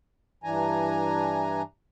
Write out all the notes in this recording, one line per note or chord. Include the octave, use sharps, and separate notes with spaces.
G2 E3 D4 G#5 A#5